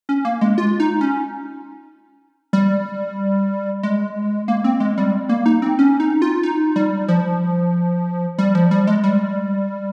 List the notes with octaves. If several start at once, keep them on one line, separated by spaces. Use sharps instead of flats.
C#4
A#3
G#3
F4
D#4
C#4
G3
G#3
A#3
C4
G#3
G3
A#3
D#4
C4
C#4
D#4
F4
D#4
G3
F3
G3
F3
G3
G#3
G3